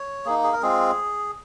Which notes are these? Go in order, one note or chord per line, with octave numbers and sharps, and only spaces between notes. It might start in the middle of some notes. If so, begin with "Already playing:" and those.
Already playing: C#5
A#3 D#4 G#4
G#4
A#4
G#3 C4 F4 G#4